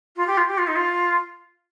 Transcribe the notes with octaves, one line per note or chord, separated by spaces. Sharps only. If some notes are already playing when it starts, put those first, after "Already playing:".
F4
G4
F4
G4
F4
D#4
F4